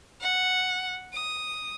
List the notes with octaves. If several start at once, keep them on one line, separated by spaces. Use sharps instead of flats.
F#5
D#6